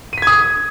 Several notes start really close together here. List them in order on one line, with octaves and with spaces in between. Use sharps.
D#7 B6 G#6 D#6